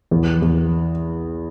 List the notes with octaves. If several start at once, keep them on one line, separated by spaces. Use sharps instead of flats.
E2
E2